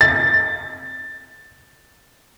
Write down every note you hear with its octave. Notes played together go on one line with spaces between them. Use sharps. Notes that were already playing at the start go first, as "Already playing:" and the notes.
A6